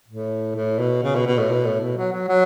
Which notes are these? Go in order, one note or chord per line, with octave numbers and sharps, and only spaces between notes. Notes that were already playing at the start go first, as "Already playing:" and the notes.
A2
A2
B2
C#3
B2
B2
A2
B2
A2
B2
F#3
F#3
F#3